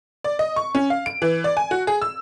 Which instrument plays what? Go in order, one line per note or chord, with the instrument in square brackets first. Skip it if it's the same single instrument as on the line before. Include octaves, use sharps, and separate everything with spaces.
[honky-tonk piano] D5
D#5
C#6
C#4
F5
D7
E3
D5
G#5
F#4
G#4
E6